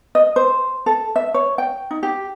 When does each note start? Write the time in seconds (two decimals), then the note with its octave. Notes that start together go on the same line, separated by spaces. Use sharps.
0.15 D#5
0.36 C5
0.86 A4
1.16 E5
1.34 C#5
1.58 G5
1.91 D#4
2.03 G4